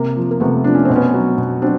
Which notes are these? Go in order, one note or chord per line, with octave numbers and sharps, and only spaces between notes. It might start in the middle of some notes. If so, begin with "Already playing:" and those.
Already playing: C3 A#3
F3
A#3
C3 A3 B3
F3 D4
C#4
B2 C4
B3 C#4
F#3
B2
F#3 C4 D4